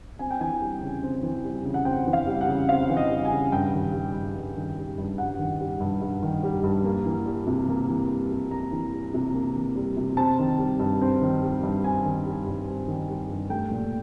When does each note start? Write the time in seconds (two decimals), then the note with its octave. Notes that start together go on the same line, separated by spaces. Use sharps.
0.19 C4 G#5
0.31 G5
0.40 E3 G#5
0.62 G3
0.82 C#3
1.03 C4
1.23 E3
1.44 G3
1.64 C#3
1.74 F#5
1.85 C4 G5
2.07 E3
2.13 F5
2.27 G3
2.41 F#5
2.48 C#3
2.69 C4 F5
2.90 E3
2.97 D#5
3.10 G3
3.25 G#5
3.31 C#3
3.52 G2 G5
3.74 D#3
3.93 G3
4.15 G2
4.36 G2
4.56 D#3
4.77 G3
4.98 G2
5.18 G2 F#5
5.39 D#3
5.61 G3
5.80 G2
6.01 G2
6.22 D#3
6.43 G3
6.63 G2
6.84 A#3
7.06 E3
7.26 G3
7.47 C3
7.69 A#3
7.89 E3
8.09 G3
8.31 C3
8.51 A#3 A#5
8.72 E3
8.93 G3
9.14 C3
9.34 A#3
9.55 E3
9.76 G3
9.97 C3
10.17 C4 A5
10.39 D#3
10.59 G3
10.80 G2
11.01 C4
11.21 D#3
11.43 G3
11.63 G2
11.84 C4 G#5
12.05 D#3
12.26 G3
12.47 G2
12.68 C4
12.88 D#3
13.09 G3
13.30 G2
13.50 A3 G5
13.71 A#2